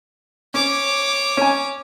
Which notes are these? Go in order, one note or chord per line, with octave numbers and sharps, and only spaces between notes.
C#4 C#5 D6
C#4 G#5